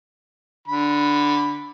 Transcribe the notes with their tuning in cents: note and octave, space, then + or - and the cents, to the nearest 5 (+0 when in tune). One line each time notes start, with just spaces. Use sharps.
D3 +0 B5 +0